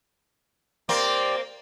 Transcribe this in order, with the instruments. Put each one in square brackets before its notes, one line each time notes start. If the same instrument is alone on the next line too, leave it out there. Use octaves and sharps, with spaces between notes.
[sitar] A#3 C4 C5 [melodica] G4 D5